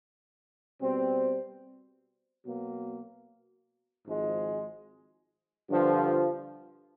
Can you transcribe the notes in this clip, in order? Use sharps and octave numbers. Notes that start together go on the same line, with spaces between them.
B2 G3 C4
B2 F#3 A#3
G#1 G#2 F3 G#3
G2 D3 F3